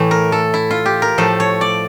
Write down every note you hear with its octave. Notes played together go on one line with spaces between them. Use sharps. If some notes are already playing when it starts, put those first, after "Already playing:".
Already playing: A2 E3 A3
A#4
A4
E4
F4
G4
A#4
A2 F3 A3 A4
C#5
D5